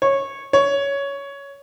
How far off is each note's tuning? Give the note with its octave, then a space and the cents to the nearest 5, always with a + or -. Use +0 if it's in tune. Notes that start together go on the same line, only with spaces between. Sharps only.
C#5 -15
C#5 +10